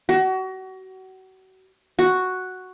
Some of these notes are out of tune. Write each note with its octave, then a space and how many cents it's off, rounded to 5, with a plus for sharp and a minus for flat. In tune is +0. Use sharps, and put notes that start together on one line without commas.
F#4 +30
F#4 +0